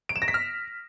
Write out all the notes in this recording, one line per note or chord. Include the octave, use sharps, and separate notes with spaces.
D7
E7
A#6
B6
F6